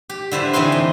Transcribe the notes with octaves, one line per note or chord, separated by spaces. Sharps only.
G4
D3 E4 B4 C5
A2 E3 C4 D#4 G#5 C6
D#5